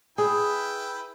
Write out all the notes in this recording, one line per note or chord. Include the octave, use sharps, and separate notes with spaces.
E4 G#4 B4 G5